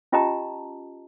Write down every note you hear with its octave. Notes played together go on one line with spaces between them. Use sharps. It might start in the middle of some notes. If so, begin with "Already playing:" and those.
C#4 F4 G4 D#5 A5 A#5